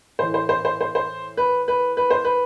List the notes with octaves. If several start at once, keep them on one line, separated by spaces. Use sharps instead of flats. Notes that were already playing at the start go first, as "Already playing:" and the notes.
A2 E3 C5
C5
C5
C5
C5
C5
B4
B4
B4
C5
B4